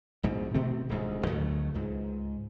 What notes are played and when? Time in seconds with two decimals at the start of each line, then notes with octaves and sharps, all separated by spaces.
0.23 A#1 G#2 B2
0.54 B2 D#3 A3 C4
0.89 D#1 D2 G#2
1.26 D2 D#3 F#3 A3
1.74 C#2 G#2